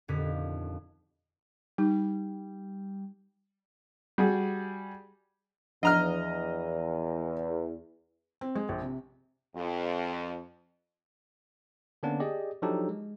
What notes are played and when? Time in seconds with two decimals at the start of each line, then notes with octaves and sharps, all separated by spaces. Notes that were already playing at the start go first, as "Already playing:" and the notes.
0.08 D#1 F2 D3 B6
1.78 G3 D#4
4.18 G3 F#4 G#4
5.83 E2 F3 D4 D#5 F#5 A#5 F6
8.41 C4
8.55 G#3
8.69 A#1
8.81 C3
9.55 F2
12.03 D3 A#3 B3 C#4 D4
12.20 G4 G#4 D5 D#5
12.62 F3 F#3 D4 D#4 G4 A4
12.89 G#3